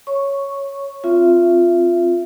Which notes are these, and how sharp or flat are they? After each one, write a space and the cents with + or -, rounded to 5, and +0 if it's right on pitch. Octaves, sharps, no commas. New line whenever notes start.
C#5 +0 C#6 +0
C4 -5 F4 +0 E5 +30